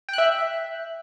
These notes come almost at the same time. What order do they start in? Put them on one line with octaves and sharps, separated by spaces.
G5 F#6 E5